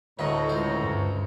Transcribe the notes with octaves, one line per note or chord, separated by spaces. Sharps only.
D2 A2 A3 B4 C#5 D#5 A#5
C#2 C5
G2